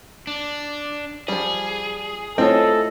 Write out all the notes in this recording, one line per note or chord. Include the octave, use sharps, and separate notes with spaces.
D4
F3 G3 G#4
A3 C4 E4 F4 A4 C#5 D#5